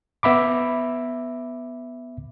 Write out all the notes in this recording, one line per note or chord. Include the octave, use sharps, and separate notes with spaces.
B3 E5 B5 D6